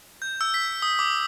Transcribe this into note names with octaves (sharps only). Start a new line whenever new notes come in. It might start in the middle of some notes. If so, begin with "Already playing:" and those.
G6
E6
B6
D#6
D6